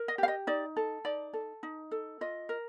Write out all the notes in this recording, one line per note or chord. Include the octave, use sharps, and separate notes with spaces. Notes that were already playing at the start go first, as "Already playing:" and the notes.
Already playing: A#4
D#5
G4 F5
D#5
D#4 D5
A4
D#4 D5
A4
D#4
A4
F4 D#5
A#4